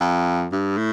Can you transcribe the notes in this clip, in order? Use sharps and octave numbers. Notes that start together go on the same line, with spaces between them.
F2
G2
A2